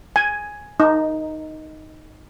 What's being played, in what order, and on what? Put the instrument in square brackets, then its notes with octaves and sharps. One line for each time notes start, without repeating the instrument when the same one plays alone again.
[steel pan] G#5
D#4